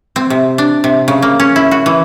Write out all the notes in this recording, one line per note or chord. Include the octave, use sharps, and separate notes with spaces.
C4
C3
D4
C3
C#3
A#3
C#4
E4
F#4
E3